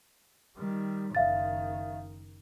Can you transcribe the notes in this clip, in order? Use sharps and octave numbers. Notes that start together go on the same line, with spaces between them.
D#3 G3
F#1 D#3 E5 F5 A6